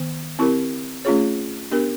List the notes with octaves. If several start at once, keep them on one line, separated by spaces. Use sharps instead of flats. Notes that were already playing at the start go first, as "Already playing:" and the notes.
Already playing: D#3 B3
C4 E4 G4 A#4
A3 C#4 F4 G#4 C#5
B3 D4 G4 A#4